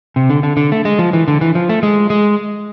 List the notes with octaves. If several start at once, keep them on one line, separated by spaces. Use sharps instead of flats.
C3
D3
D3
D3
A3
G#3
F3
E3
D3
E3
F3
A3
G#3
G#3